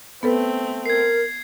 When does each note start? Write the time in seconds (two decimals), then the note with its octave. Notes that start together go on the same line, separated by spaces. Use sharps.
0.23 A3 B3 C4 A4 B4
0.86 A#4 G#6 C7